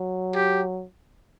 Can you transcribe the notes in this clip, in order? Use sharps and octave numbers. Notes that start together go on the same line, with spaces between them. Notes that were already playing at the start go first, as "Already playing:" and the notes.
Already playing: F#3
G4